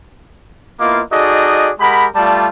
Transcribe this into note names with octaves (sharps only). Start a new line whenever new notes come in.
A#3 B3 E4 F4 D#5 D6
D#4 F#4 G#4 A4 D5 D#5
G#3 G4 A#4 F#5 B5
G3 A3 F4 D5 A5